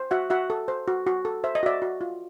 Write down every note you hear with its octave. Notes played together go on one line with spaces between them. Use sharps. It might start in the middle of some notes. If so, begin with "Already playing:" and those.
Already playing: C5
F#4 E5 F#5
F#4 E5 F#5
A4
C5
F#4
F#4
A4
C5 E5
D#5
F#4 D5 E5
F#4
F4